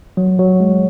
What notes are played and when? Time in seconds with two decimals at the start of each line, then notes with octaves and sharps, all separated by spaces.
0.17 F#3
0.39 F#3
0.60 G#3